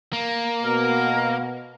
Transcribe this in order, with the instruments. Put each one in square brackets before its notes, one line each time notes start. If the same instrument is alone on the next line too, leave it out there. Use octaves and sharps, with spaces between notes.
[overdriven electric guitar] A#3
[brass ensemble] B2 [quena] A#4